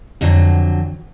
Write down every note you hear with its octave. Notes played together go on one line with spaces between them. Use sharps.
F2 D3 F#3